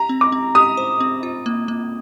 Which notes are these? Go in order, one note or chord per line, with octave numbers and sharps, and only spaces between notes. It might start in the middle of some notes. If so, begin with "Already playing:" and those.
Already playing: G4 A#5
C4
D6
C4
G4 D#6
C5
C4
F4
A#3
A#3